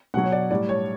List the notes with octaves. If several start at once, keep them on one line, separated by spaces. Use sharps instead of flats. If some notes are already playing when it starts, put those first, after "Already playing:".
B2 F#3 F#5
C#5
D5
A2 G3 D5
C#5